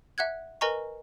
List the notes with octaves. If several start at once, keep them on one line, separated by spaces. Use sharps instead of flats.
E5 F#5 F#6 G#6
A#4 B4 D#5 G#5 A#5 C#6